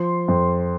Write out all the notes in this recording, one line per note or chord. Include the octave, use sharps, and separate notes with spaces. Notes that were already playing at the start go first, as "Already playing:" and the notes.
Already playing: F3 C6
F2